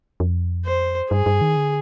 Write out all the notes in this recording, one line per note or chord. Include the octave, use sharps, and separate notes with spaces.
F2
C5
G2 G#4
G2
D#3
D3